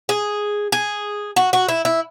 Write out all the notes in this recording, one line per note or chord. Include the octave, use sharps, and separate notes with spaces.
G#4
G#4
F#4
F#4
E4
E4